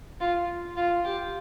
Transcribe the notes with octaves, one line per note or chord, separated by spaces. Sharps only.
F4
F4
G4